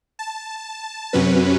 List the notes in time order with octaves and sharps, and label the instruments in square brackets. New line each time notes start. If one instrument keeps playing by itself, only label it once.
[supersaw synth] A5
F#2 C3 F#3 C#4 B4